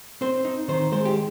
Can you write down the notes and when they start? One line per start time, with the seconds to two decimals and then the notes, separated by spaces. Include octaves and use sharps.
0.21 C4 C5
0.45 D#4
0.68 D#3 C5
0.92 G#3 C5
1.05 G4